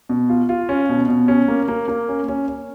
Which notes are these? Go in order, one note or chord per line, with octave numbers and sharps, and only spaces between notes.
B2
F4
F4
C#4
B2
B2
C#4
A#3
A#3
A#3
C#4
C#4
C#4